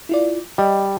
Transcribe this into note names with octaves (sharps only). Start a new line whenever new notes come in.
E4 F4 D5
G3 D#5